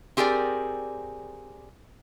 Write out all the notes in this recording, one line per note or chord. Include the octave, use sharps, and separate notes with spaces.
C4 G4 G#4 A#4 D5